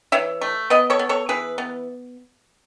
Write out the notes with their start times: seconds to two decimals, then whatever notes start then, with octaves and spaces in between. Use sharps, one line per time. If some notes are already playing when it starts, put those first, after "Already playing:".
0.12 E3 C#5 E5
0.41 A3
0.70 B3 B4 D#5
0.90 A4 C#5
0.99 B3
1.09 A4 C#5
1.29 E3 G#4 B4
1.58 B3